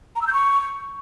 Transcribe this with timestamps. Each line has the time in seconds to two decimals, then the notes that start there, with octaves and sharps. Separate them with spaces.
0.16 A#5
0.21 E6
0.27 G6
0.33 C#6